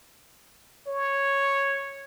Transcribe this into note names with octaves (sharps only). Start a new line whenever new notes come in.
C#5